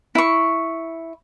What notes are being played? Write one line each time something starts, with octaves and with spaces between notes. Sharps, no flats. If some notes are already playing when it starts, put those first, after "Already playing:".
E4 C#6